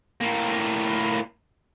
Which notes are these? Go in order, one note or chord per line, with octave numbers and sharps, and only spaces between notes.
A2 A#3